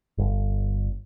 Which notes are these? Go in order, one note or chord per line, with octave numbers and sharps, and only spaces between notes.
G1